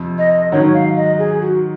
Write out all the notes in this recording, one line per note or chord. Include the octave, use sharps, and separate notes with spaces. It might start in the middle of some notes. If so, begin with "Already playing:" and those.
Already playing: F2 C3 F3
D#5
G#2 D#3 F#3 C#5
F5
D#5
G#4
F#4